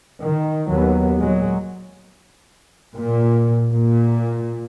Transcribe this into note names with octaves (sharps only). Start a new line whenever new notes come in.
D#3
D#2 F#3 B3
A#2 F#3 G#3
A#2
A#2